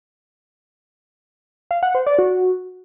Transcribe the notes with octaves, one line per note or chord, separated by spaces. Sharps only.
F5
F#5
C5
D5
F#4